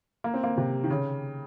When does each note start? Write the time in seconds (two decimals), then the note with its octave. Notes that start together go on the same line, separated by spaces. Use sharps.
0.24 A#3
0.34 C4
0.43 A#3
0.57 C3
0.84 D#3
0.90 C#3